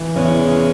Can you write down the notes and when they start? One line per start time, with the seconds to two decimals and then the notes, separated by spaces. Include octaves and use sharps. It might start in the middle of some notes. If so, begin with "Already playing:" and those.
Already playing: E3
0.15 E2 C#3 E3 G#3 C#4